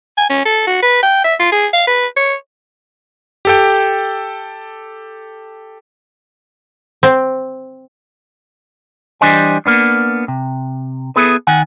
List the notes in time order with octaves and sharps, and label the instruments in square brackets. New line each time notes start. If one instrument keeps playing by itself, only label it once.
[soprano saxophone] G#5
C#4
A4
F#4
B4
G5
E5
F4
G#4
F5
B4
C#5
[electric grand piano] G4 A4 G5
[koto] C4
[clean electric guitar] E3 G3 D4 C5 D#5 G#5
A#3 B3 D4
C3
B3 E4 G#4 A4 B4
D#3 F#5 G#5